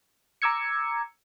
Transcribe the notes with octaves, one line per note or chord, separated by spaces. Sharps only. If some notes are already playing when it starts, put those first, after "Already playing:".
A#5 D6 E6 G#6 C#7